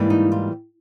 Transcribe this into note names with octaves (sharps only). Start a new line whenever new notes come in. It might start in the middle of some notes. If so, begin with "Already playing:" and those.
Already playing: G#2 E3 G3 A#3
D#4
F4